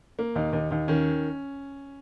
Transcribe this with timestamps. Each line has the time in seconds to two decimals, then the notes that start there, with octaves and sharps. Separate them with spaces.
0.19 A#3
0.35 D#2 D#4
0.53 D#2 D#4
0.71 D#2 D#4
0.88 D#3 C#4